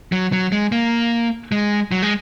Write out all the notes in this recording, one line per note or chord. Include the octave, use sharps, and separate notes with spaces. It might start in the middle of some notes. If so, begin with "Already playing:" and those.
F#3
F#3
G#3
A#3
G#3
F#3
G#3